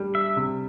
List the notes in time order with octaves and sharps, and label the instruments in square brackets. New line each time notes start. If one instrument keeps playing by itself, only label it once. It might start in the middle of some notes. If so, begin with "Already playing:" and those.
Already playing: [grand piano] G3 D4
[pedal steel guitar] E5
[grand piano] C3